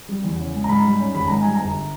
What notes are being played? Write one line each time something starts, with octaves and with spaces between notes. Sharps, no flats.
G3
E2
C#3
G#3
A#5
G#2 B5
G3
C#4
G#1 B5
G#2 A#5
G3 G#5
G1 A#5